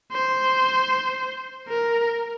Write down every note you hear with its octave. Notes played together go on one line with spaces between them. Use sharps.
C5
A#4